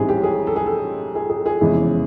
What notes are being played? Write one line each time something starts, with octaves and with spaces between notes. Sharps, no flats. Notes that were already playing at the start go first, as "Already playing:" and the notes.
Already playing: A1 G#2 E3 G3 C4 G#4
G4
G#4
A4
G#4
A4
G#4
G#4
G#4
F1 E2 C#3 E3 G#3